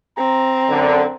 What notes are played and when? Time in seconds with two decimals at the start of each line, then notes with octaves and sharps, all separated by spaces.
0.18 C4 A#5
0.69 F#2 D3